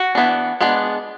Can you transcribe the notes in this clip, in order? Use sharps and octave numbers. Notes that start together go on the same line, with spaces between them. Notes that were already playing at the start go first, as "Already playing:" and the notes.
Already playing: F#4
E3 B3 D4
G#3 B3 D4